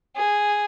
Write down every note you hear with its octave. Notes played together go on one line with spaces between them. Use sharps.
G#4